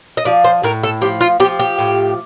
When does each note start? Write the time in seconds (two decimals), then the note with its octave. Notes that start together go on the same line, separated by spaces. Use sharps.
0.17 D#5
0.25 F3 D5
0.44 C5
0.63 A2 A#4
0.84 A4
1.01 F3 G4
1.21 F4
1.40 F3 G4
1.60 G4
1.79 A2